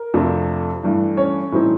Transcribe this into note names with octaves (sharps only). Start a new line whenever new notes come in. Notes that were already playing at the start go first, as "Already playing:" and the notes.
Already playing: A#4
F2 C3 F3 A3 D4
G2 E3 A3 D4
C#4 C#5
A2 E3 G3 C4 D#4